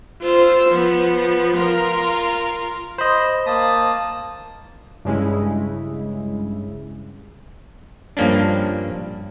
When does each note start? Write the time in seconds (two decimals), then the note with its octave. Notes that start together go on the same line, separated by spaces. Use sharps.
0.22 F4 C5 E6
0.71 F3 B3
1.56 F4 A#4
2.98 C5 D#5 B5
3.46 A#3 A5 D#6
5.05 G2 C#3 G#3 E4
8.17 G2 F3 A#3 C#4 D4